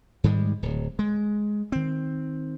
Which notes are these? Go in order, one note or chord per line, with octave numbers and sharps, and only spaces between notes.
G#2 D#3 G3 G#3
D1
G#3
D#3 C4